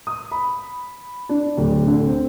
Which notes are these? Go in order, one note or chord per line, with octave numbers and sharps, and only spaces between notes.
D#6
B5
D4
D1
D3
C4